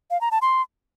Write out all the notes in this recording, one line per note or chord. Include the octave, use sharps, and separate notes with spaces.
F5
A#5
A5
C6